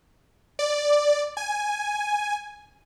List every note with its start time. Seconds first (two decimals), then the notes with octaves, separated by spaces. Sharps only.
0.59 D5
1.37 G#5